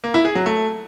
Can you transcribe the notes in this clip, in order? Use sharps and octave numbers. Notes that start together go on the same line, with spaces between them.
A#3
E4
G#4
F#3
A3